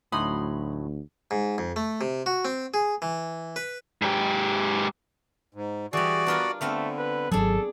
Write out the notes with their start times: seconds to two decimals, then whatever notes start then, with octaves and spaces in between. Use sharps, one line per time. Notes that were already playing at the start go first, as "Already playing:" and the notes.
0.12 D2 A2 F#3 D#4 B5 C6 D#6
1.31 G#2
1.58 F2
1.76 A3
2.01 C3
2.26 F#4
2.45 C4
2.74 G#4
3.02 E3
3.56 B4
4.02 G#2 G4
5.54 G#2
5.93 E3 G3 F#4 G#4 D5
6.27 B3 D4 F4 A#4
6.61 D3 A3 B3 C4 F5
6.98 B4
7.32 G#1 F#3 D4 G#4 A4